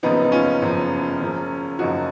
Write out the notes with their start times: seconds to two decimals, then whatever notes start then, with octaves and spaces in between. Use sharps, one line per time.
0.03 F#1 F#2 F3 B3 D#4
0.24 D#4
0.32 C#4 F4
0.63 F#1 F#2 F3
1.20 F#1 F#2 F3
1.79 F#1 F#2 F3 D#4 F#4